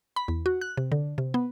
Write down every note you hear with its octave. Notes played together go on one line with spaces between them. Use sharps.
B5
E2
F#4
F#6
C3
D3
C3
B3